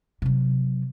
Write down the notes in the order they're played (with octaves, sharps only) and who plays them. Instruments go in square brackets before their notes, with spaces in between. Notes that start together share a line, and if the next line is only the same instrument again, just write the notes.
[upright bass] C3 F#3